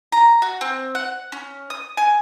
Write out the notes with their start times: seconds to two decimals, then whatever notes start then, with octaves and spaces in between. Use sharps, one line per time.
0.12 A#5
0.42 F#4
0.61 C4
0.95 F#5
1.32 C#4
1.70 D#6
1.97 G#5